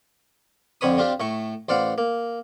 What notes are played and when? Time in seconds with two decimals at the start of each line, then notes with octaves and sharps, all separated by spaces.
0.81 F2 D3 C4 C#5 B5 D#6
0.98 C4 D4 F4 G4
1.20 A2 A3 C#6
1.69 A1 C5 D5 F5 F#5
1.98 A#3